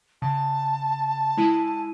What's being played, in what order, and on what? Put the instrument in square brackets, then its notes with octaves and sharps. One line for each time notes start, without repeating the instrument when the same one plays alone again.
[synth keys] C#3 [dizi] A5
[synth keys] G#3 E4 D#7